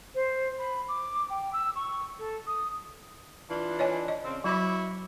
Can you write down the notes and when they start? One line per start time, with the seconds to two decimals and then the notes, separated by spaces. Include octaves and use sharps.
0.14 C5
0.59 B5
0.88 D6
1.29 G5
1.53 E6
1.75 C#6
2.18 A4
2.47 D#6
3.49 E3 D4 F4
3.79 C#5 D#5 G#5
4.08 D#5
4.24 C#3 C4
4.44 F#3 E4 F#4 C#5 B5 D6